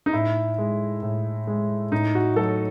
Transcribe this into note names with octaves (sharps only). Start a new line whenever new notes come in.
D#4
A2 E4
G#3
A2
G#3
A2 D#4
F#4
F#3 A3 A4